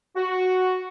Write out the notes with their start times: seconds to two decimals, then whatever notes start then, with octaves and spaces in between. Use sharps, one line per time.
0.16 F#4